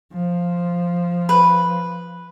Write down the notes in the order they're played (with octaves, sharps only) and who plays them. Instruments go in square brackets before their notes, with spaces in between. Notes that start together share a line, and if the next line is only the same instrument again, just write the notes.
[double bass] F3
[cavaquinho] B4